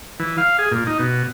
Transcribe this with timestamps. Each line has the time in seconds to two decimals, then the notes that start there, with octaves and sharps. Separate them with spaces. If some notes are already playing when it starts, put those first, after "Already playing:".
0.20 E3
0.38 F5
0.59 G#4
0.72 A#2
0.87 D#4
0.99 B2